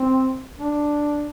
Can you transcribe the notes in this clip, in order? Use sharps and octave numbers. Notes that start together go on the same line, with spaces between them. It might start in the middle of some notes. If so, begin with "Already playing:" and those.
Already playing: C4
D4